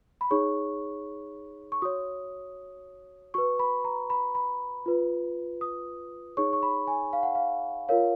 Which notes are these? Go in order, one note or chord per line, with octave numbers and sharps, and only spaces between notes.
B5
D#4 G#4 C#5 C#6
C#6
F#4 C#5 D#6
F#4 B4 C#6
B5
A#5
B5
B5
F4 B4
D#6
D#4 G#4 C#5 C#6
C#6
B5
G#5
F5
F#5
F5
F4 A#4 C#5 F5